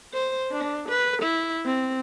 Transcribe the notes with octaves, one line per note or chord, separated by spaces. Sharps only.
C5
D4
B4
E4
C4